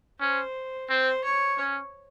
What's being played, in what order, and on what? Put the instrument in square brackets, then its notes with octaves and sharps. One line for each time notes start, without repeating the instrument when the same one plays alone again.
[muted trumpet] C#4 [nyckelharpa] C5
[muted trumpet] C4 [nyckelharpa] C5
[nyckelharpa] C#5
[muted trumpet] C#4